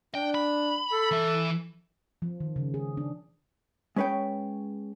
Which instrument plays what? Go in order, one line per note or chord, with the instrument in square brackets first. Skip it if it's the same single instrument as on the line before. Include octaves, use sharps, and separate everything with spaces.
[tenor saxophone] D4 [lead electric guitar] G5
[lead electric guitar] B5
[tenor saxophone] A4
[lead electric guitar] E3 E5
[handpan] F3
D#3
C#3
G#4
D4
[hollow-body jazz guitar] G#3 C#4 B4 C#5 G5